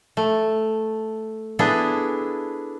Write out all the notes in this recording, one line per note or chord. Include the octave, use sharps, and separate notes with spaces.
A3
B3 D4 E4 G#4 A4